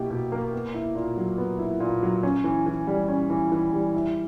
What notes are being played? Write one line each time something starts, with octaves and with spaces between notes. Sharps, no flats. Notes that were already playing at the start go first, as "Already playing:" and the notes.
Already playing: B2 A#3 E4 G4
B2
A#3
B3
E4
A#2
F#3
B3
E4
A#2
F#3
C#4
E3
E3
G3
C#4
E3
E3
G3
E4